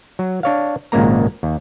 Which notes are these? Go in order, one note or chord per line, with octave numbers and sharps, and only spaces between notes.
F#3
D4 C#5 F5
G#1 A#2 C#3 G#3 A#3 A#5
D#2